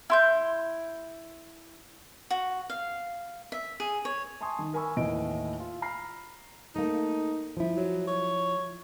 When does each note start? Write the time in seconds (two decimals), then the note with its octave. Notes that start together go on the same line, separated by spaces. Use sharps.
0.10 E4 C6 G6
2.31 F#4
2.70 F5
3.52 E5
3.80 G#4
4.05 C#5
4.41 G#5 A5 C6 C#6 D#6
4.59 D#3
4.74 A#4 G#5 B5 C#6 E6
4.97 D#2 A2 E3 D#5 D7
5.60 F4
5.82 A#5 B5 F6 C7
6.76 A3 A#3 D#4
7.57 F3 E4
7.77 F#3
8.07 C#5